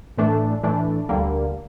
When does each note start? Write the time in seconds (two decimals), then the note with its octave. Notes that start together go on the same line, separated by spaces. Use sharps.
0.18 A2 E3 A3 D4
0.63 A2 E3 A3 D4
1.09 D2 D3 G3 A#3